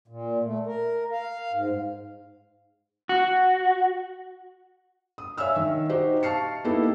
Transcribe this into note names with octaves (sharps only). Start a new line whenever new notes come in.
A#2
A3
A#4
F5
G#2
F#4
D#6
C#5 E5 F5 G#5 E6 F6
D#3 E5
D#4 F#4 G4 C5
F5 A5 C#6 F6 C7 C#7
A#3 B3 D#4 E4 G4 A4